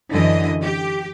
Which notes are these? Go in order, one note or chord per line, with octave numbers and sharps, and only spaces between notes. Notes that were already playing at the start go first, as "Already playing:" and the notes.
F#2 D3 E3 D#5
G4